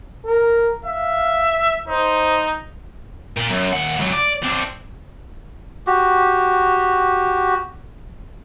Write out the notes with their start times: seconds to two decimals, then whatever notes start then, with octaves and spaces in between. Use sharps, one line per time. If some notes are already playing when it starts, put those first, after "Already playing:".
0.25 A#4
0.85 E5 F5
1.88 D#4 C5
3.37 A#2
3.49 F#2
3.73 D#2 F#5
3.99 C#2 F#3
4.12 D5
4.43 C4 D4
5.87 F#4 G4